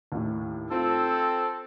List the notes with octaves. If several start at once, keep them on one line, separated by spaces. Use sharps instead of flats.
D#2 A2
C4 F4 A4